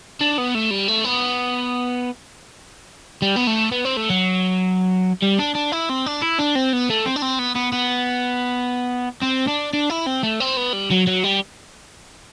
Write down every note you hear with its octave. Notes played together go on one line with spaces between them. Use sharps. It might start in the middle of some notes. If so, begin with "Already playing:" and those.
D4
B3
A3
G3
A3
B3
G3
B3
A3
B3
C4
A3
F#3
G3
D4
D4
E4
C4
D4
E4
D4
C4
B3
A3
C4
D4
C4
B3
B3
B3
C4
D4
D4
E4
C4
A3
C4
B3
G3
F#3
F#3
G3